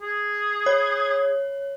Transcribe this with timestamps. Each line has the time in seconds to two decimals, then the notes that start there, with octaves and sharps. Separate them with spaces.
0.01 G#4
0.66 C#5